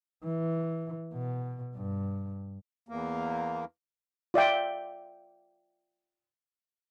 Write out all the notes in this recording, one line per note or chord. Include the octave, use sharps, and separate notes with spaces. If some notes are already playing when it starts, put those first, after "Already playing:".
E3
B2
G2
E2 A#3
F4 D5 E5 G5